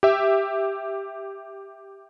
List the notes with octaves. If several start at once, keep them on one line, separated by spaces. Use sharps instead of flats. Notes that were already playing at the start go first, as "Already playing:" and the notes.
G4 E5